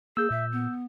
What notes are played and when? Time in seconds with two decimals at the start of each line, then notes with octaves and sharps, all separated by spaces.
0.17 A#3 G#4 E6 G6
0.30 A#2 E5
0.52 B3